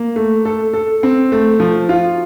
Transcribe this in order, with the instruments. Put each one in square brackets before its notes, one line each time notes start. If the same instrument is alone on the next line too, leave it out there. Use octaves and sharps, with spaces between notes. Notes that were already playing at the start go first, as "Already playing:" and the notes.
Already playing: [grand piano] A#3
A3
A4
A4
C4
A3
F3
F4